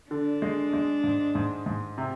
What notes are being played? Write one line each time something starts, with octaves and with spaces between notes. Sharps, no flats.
D3 D4
G#3
G#3
G#2
G#2
G#2
C3